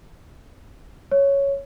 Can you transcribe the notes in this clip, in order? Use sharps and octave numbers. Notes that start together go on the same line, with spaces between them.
C#5